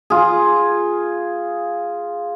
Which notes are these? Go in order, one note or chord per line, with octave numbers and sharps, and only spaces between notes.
F4 G#4